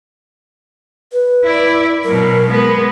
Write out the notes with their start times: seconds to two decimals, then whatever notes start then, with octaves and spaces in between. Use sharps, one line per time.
1.12 B4
1.43 E4 D5
2.04 B2 F#3 A#4
2.47 G#3 B3